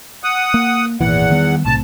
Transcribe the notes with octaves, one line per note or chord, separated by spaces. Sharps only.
F#5 D#6
A#3
G#1 E2 A#2 E3 F#5
D#3 G3 B3
B1 A2 C3 A5